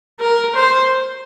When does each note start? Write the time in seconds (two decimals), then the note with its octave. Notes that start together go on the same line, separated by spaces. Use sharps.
0.19 A#4
0.55 C5